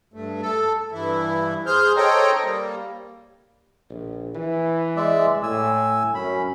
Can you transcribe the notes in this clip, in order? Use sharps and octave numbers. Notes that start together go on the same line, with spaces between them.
G2 A3
A4
G2 E3 E4
G#4 C5 F6 G6
A4 C5 C#5 D#5 G5 A#5
G3 A#3
A#1
E3
G#3 D5 E5
A2 G#5 E6
F#2 C#4 B5